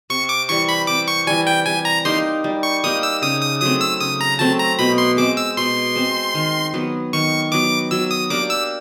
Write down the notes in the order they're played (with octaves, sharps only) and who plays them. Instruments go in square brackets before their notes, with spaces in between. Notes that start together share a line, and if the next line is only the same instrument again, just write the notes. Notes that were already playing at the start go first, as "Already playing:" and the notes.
[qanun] C3 [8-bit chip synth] C#6
[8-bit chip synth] D6
[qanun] E3 G3 [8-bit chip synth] C#6
[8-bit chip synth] B5
[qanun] C3 [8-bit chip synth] D6
[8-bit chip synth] C#6
[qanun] E3 G3 [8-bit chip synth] G#5
[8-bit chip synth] G5
[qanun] G3 [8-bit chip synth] G#5
[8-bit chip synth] A#5
[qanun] A#3 D#4 G4 [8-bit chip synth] C6
[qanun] G3
[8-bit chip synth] C#6
[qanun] A#3 D#4 G4 [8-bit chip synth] D#6
[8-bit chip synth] E6
[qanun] C#3 [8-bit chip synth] D#6
[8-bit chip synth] D#6
[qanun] F#3 A3 C4 [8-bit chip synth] D#6
[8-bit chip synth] E6
[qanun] C#3 [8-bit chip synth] D#6
[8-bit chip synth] A#5
[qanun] F#3 A3 C4 [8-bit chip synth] A5
[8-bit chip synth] A#5
[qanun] B2 [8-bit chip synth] B5
[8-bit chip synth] C6
[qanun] G#3 C4 [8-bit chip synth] D6
[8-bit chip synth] E6
[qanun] B2 [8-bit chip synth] C6
[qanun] G#3 C4
D#3
F#3 B3
[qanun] D#3 [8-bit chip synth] C#6
[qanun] F#3 B3 [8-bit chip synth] D6
[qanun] F#3 [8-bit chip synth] E6
[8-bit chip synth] D#6
[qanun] A#3 D4 G4 [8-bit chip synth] D6
[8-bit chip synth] E6